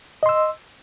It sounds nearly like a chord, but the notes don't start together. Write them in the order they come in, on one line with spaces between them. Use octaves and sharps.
D#5 C6 E6